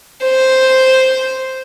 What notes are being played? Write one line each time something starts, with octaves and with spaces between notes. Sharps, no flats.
C5